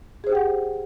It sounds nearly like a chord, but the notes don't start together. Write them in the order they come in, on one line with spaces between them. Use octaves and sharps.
G#4 C5 G4 G5 F#5